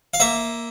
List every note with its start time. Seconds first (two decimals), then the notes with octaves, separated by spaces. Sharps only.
0.14 F5
0.20 A#3 E5